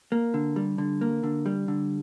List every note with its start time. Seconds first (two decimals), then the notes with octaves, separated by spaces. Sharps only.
0.12 A#3
0.34 D3
0.56 G3
0.78 D3
1.01 A#3
1.23 D3
1.46 G3
1.68 D3